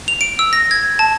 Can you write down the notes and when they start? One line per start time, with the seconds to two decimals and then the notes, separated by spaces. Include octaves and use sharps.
0.08 F7
0.21 D7
0.39 E6
0.53 A#6
0.71 G#6
0.99 A5